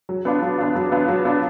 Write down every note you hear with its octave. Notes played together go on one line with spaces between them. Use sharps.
F#3
B3 D4 F4
F#3
B3 D4 F4
F#3
B3 D4 F4
F#3
B3 D4 F4